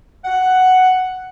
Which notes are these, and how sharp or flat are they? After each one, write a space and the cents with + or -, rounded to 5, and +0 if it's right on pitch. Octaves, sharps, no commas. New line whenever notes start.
F#5 +5